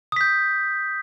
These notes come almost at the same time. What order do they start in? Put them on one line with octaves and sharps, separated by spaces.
D#6 B6 G6